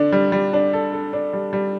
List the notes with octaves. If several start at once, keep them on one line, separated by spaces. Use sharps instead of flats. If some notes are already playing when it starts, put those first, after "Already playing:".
Already playing: D3 D4
G3
G3
D4
A4
A4
D4
G3
G3